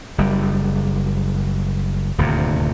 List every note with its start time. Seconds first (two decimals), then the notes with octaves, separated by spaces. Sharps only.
0.18 F#1 G3
2.18 D#1 D2 G2 C3